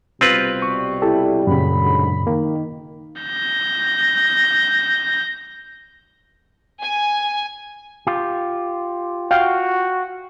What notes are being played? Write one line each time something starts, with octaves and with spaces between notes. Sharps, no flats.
C2 B2 G3 C4 F4 B4
C#6
E4 G4 A4
F#2 A#2 C#3 B5
G#2 D3 F#3
D#3 A#3
G6 A#6
G#5
F4 G4
F#4 F5 G5